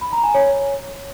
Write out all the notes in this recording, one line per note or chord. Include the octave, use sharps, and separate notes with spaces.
B5
A#5
G#5
C#5